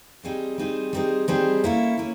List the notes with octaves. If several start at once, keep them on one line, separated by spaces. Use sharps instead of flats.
G3 C4 D#4 G#4 C5
G3 C4 D#4 G#4 C5
G3 C4 D#4 G#4 C5
G3 C4 D#4 G#4 C5
A#3 C#4 E4 A4
A#3 C#4 E4